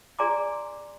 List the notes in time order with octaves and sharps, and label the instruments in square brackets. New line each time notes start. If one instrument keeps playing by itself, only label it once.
[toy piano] G#4 D5 G#5 A#5 C6 D6